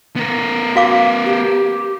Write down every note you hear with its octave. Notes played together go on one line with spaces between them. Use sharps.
B3 A#4
F#4 F5 D6
G4